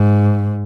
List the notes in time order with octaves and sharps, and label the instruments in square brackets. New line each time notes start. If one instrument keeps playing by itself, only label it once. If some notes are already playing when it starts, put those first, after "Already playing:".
Already playing: [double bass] G#2